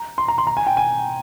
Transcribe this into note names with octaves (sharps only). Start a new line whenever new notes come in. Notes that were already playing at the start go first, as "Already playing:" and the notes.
Already playing: A#5
C6
A#5
C6
A#5
G#5
G5
G#5